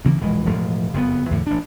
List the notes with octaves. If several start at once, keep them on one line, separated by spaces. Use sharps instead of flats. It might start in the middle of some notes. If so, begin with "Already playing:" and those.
D2 C#3 E3 A#3
E1 A#1 E3 G#3
E1 A2 F3
F#1 F2 B2 B3
E2 A2 D3
A1 D4